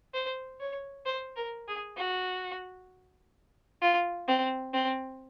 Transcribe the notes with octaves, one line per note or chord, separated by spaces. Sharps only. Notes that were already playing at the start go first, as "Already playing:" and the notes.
C5
C#5
C5
A#4
G#4
F#4
F4
C4
C4